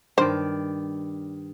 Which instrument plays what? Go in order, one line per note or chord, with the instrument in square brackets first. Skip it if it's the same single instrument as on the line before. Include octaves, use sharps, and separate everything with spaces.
[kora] G2 D#3 D5 [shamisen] C5